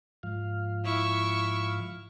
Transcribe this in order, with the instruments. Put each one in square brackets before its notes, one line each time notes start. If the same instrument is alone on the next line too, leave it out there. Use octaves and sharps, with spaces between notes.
[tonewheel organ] G#2 F3 F5
[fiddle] E4 C#6